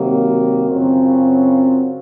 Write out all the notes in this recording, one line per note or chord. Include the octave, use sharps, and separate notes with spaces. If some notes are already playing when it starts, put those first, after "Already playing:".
Already playing: C3 D#3 F#3 A#3
F#2 C#3 F#3 C4 F4